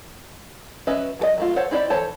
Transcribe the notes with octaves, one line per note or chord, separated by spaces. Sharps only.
F#3 C#4 B4 D#5 E5
F#3 A4 D#5
F#3 A3 F4
A4 C5 C#5 F5 F#5
C4 D#4 E4 G4 D5
E3 A4 C5 C#5 A5